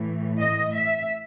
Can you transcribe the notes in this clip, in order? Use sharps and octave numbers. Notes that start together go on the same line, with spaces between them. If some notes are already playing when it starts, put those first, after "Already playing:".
Already playing: A2 E3 A3
D#5
E5